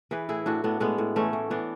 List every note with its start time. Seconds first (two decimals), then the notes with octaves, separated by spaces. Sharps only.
0.11 E3 G#4 B4
0.29 A2 E4 G#4
0.46 A2 D4 F#4
0.64 A2 B3 D4
0.80 A2 G#3 B3
0.98 A2
1.16 E3 A3 C#4
1.33 E3
1.50 E3 B3 D4